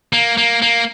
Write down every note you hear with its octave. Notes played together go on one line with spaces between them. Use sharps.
A#3
A#3
A#3